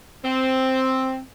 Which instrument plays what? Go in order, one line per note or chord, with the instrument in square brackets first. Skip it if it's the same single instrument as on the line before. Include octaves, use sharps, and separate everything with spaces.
[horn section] C4